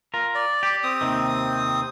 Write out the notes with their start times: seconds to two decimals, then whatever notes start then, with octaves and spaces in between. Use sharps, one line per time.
0.14 F4 A#4
0.35 D5
0.63 G4
0.84 C4 D#6
1.01 D#2 C3 D#3